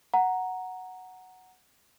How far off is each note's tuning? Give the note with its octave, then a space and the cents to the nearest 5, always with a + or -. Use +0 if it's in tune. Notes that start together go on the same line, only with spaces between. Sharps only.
F#5 +0 A#5 +0